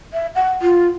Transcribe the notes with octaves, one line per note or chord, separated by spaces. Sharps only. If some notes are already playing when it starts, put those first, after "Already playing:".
E5
F#5
F4